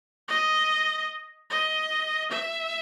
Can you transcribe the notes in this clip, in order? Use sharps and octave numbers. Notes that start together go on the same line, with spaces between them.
D#5
D#5
E5